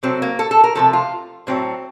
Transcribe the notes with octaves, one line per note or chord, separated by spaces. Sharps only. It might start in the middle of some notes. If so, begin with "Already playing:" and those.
C3 F#3 A3 C4
A#3
A4
A4
A#4
C3 F3 A3 A4
F4
A2 F#3 A3 C4